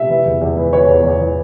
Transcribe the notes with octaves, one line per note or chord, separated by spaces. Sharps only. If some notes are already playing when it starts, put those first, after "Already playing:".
Already playing: C3 E5
E3
E2
E2
E3
E3 C#5
E2
E2
E3